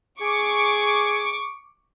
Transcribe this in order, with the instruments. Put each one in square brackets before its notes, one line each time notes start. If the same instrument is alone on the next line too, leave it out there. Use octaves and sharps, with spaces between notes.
[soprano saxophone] G#4 [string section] C#6 D6